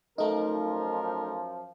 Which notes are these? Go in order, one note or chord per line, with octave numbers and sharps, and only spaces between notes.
F#2 F3 A3 D#4 A#4